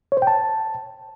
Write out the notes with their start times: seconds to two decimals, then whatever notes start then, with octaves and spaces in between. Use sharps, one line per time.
0.12 C#5
0.17 C5
0.22 G5
0.27 A5